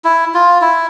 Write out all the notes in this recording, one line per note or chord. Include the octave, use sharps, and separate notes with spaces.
E4
F4
E4